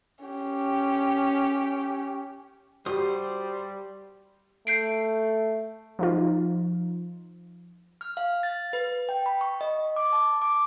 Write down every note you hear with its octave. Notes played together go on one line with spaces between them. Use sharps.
C#4 G4
G3 F#4 G4 C5 D#6
A3 G6 C7 D7
F3 D#4 F4
F6
F5
A6
B4
G5
B5
C#6
D#5
D6
A5
D6